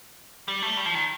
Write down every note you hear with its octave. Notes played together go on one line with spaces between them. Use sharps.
G3
A3
G3
F3
D#3